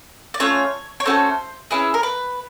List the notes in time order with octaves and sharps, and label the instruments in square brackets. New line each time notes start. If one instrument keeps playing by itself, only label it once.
[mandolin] D5
A3 C#4 F4 C#5
C#5
A3 C#4 F#4 A4 C5
C#4 E4 G#4 B4
A#4
B4